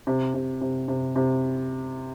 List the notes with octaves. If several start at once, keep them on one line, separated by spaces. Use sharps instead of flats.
C3
C3
C3
C3
C3